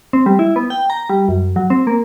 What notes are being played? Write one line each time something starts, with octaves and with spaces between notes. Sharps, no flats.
C4
G3
E4
B3
G5
A#5
G3
F#2
F#3
C4
A#3